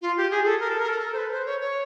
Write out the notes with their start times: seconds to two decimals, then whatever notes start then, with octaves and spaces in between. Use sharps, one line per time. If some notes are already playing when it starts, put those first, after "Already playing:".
0.02 F4
0.17 G4
0.31 G#4
0.45 A4
0.60 A#4
0.69 A4
0.79 A#4
0.89 A4
1.13 C5
1.18 B4
1.32 C5
1.46 C#5
1.61 C#5